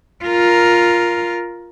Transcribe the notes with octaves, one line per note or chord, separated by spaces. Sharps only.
F4 A#4